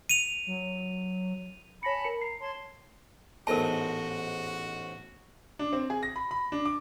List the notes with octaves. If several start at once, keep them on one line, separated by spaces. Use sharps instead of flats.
D#7 F7
F#3
C#5 G#5 A5 B5 A#6 C#7
A#4 C#7
A#5 C7
C#5 A5 C6
A1 G#2 B3 F#4 A4 A#4 D#5 A5
D4
C4
G#4
A#6
B5
B5
D4
D6